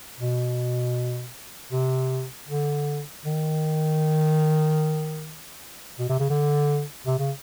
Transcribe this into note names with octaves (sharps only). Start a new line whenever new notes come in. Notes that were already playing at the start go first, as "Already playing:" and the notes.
B2
C3
D3
D#3
B2
C3
C#3
D3
C3
C#3